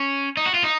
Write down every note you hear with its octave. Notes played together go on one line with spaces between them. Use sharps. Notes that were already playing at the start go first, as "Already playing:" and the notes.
Already playing: C#4
D#4
F#4
F4
D#4